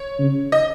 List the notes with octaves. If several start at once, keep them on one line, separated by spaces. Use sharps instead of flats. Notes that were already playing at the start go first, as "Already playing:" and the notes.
Already playing: C#5
C#3
D#5